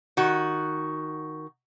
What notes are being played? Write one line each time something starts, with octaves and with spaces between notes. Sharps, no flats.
D#3 F#4